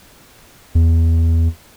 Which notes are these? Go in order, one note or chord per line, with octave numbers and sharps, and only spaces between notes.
E2